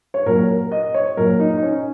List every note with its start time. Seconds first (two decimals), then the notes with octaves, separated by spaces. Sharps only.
0.14 C#5
0.26 A#2 F#3 A#4
0.49 A#4
0.72 D#5
0.94 C#5
1.17 A#2 F#3 A#4
1.40 D#4
1.57 D#4
1.63 C#4